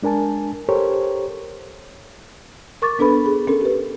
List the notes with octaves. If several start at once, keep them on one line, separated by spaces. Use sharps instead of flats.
G#3 D4 A#4 G#5 A5
G4 A4 A#4 C5 C#5
A#4 C#6 D6 A6
B3 D4 A4 B4 B5
G#4
C#4 A4 A#4
G4 B4